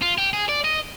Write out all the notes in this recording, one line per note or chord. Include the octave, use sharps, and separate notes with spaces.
F4
G4
G#4
D5
D#5